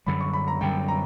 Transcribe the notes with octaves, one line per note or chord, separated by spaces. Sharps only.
F#2 D3 G3 B5
C#6
B5
A#5
F#2 D3 G3 G5
A#5